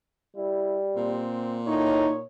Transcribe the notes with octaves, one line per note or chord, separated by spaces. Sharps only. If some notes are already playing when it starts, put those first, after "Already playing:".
G3 E4
A#2 C4
A2 D#4 C#5